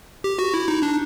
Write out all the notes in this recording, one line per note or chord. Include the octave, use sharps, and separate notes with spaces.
G4
F#4
E4
D#4
D4